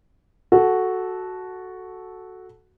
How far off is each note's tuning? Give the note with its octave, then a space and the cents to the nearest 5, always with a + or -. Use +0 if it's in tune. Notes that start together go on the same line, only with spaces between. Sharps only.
F#4 +0 A4 -10